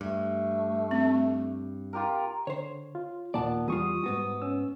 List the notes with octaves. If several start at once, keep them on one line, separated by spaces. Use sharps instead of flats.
G2 A3
C4
F4 G4 A#4
D3 C5 C#5
F4
D#2 A#2 D#3 B3 D5 A5
E2 G3 F4 C#6 D#6
G#2 B3 F#4
C#4 E6